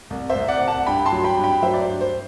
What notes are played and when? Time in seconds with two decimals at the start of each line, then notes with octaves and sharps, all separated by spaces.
0.10 C2
0.29 C5 E5
0.36 C2
0.48 D5 F#5
0.61 C2
0.67 F#5 A5
0.87 G2 G5 B5
1.06 A5 C6
1.12 F#3
1.24 G5 B5
1.37 G2
1.44 G5 B5
1.62 F#3 C5 E5
1.74 D5
1.82 C5
1.88 G2
2.01 C5